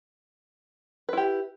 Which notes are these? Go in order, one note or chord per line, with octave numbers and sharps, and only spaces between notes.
E4 G4 B4